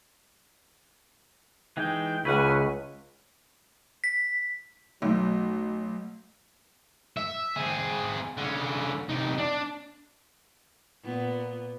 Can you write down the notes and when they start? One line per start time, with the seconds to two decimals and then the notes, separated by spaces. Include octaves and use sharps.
1.77 E3 G#3 D#4 G5
2.25 C#2 E4 B4 F#5 C#6 F6 D#7
4.04 B6
5.02 B1 F#3 A3
7.17 E5
7.56 C4 G#4
8.37 D3 C#4
9.09 C3 D#4
9.38 D4
11.03 A#2 B3